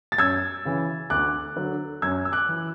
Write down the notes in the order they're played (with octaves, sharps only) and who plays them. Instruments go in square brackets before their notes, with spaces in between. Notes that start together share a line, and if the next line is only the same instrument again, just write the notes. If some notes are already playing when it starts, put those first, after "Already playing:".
[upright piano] A6
F#2 E6 G#6
C#3 E3
D2 D6 F#6
D3 F#3
F#2 E6 G#6
E6
D6 F#6
E3